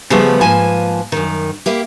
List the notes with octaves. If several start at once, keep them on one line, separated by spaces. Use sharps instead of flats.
C#3 F3 G3 A3 B3 F#4
G#2 F3 A#3 B4 G#5 A5
F#2 D#3
A#3 E4 G4